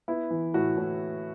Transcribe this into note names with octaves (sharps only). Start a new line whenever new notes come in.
B3 E4
E3
A2 F#4
A2